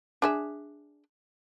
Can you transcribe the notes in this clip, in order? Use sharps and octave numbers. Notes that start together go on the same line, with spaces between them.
D4 G#4 E5